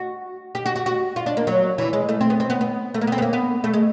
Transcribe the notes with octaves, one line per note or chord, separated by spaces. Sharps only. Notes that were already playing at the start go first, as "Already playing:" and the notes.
Already playing: F#4
G4
F#4
F#4
F#4
F4
D4
A#3
F#3
E3
G#3
A3
C4
B3
C4
B3
B3
A3
A#3
B3
C4
B3
A#3
B3
A3
G#3